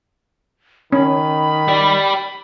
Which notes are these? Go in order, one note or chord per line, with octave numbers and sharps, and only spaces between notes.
D#3 C#4 B5
G4 D5